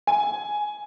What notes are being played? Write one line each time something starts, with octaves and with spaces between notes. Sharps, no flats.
G#5